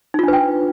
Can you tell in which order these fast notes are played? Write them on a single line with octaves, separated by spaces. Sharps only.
D#4 F4 D4 B4 G5